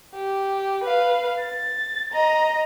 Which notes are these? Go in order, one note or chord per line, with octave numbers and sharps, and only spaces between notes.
G4
B4 F5
A6
D#5 A#5